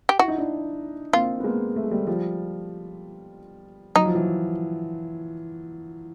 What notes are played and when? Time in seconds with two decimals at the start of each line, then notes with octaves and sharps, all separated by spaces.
0.09 G4
0.19 E4 F#4
0.28 D#4
0.38 D4 E4
1.13 A#3 C4 F4
1.40 B3
1.44 G#3 A#3
1.76 A3
1.84 G#3
1.91 G3 A3
2.07 F3 G3
3.95 F#3 D#4
4.06 F3
4.15 E3 F#3